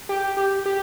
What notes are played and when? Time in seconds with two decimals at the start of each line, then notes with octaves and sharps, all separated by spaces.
0.09 G4
0.37 G4
0.66 G4